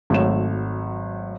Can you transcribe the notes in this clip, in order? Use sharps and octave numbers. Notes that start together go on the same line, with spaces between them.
G#1 F#3 A3 C#5 E7